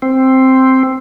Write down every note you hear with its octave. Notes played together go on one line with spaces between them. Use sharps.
C4